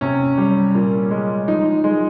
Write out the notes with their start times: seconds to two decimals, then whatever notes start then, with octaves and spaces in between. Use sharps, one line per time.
0.01 C3 C#4
0.38 G3
0.74 A#2
1.11 G#3
1.47 F3 D#4
1.84 G#3